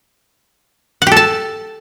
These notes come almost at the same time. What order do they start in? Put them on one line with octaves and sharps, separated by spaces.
F#5 G4 A4 A5